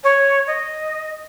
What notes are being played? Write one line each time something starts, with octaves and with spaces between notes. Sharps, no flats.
C#5
D#5